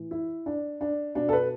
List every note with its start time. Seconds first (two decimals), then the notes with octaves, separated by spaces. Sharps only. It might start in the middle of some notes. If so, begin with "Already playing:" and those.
Already playing: A2 E3
0.11 E4
0.46 D4
0.81 D4
1.15 B2 D4
1.29 A4
1.33 B4